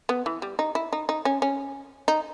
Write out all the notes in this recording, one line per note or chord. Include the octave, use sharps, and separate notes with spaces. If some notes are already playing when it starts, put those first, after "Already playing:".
B3
E3
G3
D#4
E4
D#4
D#4
C#4
C#4
D#4